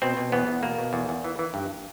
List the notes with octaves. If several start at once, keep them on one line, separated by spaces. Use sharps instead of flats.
B2 C4
B2
E2 B3
E2
B2 A#3
B2
E2
E2
E3
E3
G2